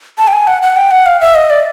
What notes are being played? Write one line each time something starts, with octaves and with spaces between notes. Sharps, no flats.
A5
G5
G#5
F#5
F#5
G5
F#5
F5
E5
D#5
D5